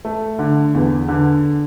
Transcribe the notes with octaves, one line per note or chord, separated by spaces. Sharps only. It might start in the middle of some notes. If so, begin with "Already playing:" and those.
A3
D3
E2
D3